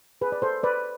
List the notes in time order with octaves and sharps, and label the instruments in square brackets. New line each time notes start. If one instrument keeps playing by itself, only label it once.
[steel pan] G#4 B4
D5
A4 C5
B4 D5